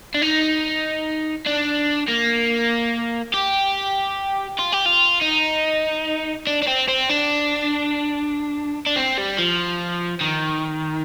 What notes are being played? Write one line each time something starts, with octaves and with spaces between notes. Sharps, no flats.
D4
D#4
D4
A#3
G4
F4
G4
F4
D#4
D4
D4
C4
C4
D4
D4
C4
G3
F3
D#3